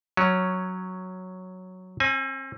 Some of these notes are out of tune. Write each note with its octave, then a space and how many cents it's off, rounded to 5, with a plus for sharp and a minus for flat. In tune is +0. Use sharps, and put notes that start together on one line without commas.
F#3 +0 C#4 +0
C4 +40 G#5 +0